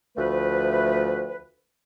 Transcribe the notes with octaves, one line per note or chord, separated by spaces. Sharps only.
D2 F3 A3 B4